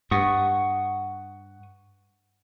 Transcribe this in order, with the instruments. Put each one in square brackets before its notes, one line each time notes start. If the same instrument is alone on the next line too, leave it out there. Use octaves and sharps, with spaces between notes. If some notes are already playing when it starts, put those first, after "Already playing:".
[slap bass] G2 [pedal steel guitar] F#5 C#6 D#6